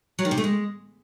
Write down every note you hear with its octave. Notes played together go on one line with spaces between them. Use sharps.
F#3
D#3
C3
A3
G#3